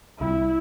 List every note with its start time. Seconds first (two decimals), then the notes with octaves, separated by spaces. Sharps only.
0.20 C2 C3 G3 E4